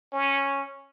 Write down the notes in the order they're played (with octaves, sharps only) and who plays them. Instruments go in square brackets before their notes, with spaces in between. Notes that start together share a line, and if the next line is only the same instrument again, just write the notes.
[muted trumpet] C#4